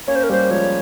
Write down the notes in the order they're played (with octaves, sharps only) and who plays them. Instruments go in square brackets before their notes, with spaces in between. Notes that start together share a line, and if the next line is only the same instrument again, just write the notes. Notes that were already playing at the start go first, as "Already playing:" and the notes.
[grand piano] A#3 C#4 [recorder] C#5
[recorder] C5
A#4
[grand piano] G3 A#3 [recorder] C5
[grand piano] F3 G#3 [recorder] C#5